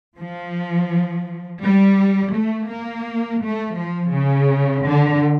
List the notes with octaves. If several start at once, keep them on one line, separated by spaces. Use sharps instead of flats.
F3
G3
A3
A#3
A3
F3
C#3
D3